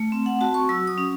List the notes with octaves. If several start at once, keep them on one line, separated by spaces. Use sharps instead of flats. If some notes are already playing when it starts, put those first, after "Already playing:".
Already playing: A3
C4
F#5
F#4 A5
C#6
F#3 E6
D#6
C#4